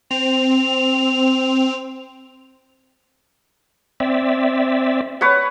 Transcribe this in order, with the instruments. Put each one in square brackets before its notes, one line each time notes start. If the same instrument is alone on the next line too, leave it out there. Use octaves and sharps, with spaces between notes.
[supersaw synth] C4 [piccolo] F7
[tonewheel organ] C4 D5 E5
[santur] B4 C#5 F#5